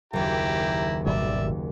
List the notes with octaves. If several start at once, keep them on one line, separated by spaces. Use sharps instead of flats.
F#1 D#2 E4 G4 A#5
G#1 B2 G3 D5 E5